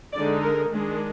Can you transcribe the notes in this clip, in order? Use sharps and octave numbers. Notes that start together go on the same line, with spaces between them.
D3 G#3 D#4 D5
A#4
D#3 G#3 D4